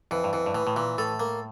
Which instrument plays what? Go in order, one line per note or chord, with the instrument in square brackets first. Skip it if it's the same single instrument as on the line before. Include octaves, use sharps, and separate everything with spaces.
[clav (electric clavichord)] F2 [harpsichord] E3
[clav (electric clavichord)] G2
[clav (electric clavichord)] F2 [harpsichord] E3
[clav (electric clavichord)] G2
[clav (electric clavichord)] A2 [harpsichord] E3
[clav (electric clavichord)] A2
[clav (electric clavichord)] A#2 [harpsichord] E3
[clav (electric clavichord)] A2 [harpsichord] A4
[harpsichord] A#3